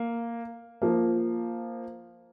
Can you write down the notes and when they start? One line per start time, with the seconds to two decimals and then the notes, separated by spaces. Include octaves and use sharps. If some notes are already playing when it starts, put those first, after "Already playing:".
Already playing: A#3
0.82 F3 A#3